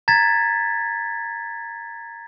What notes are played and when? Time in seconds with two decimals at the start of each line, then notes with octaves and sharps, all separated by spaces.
0.08 A#5 G#6 A6 B6